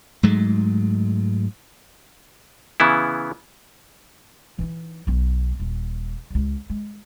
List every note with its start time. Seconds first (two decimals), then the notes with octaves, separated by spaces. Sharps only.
0.23 G#2 F#3 G#3 A3
2.80 C#3 E3 B3 E4
4.58 E3 D#4
5.07 B1 B3
5.60 D#1
6.30 D#1 C#2
6.70 G#3